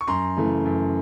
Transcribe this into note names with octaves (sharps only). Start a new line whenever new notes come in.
C#6
F#2 A#5 C6
C#3 E3 A3
F#2